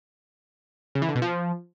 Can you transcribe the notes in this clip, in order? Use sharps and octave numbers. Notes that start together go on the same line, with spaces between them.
C#3
E3
D3
B2
F3